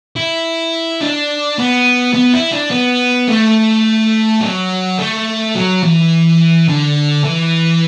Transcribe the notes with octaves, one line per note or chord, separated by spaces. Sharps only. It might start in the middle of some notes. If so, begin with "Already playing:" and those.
E4
D4
B3
B3
E4
D4
B3
A3
F#3
A3
F#3
E3
D3
E3